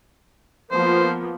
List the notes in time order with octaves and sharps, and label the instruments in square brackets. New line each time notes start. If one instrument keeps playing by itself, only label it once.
[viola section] F3 A#3 B3 [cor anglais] C5